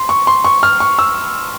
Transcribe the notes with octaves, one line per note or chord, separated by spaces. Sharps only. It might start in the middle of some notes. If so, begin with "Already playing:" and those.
Already playing: C6
C#6
C6
C#6
F6
C#6
E6